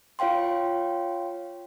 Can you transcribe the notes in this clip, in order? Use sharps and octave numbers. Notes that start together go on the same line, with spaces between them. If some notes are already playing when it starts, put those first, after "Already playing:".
F4 C#5 F5 G5 C6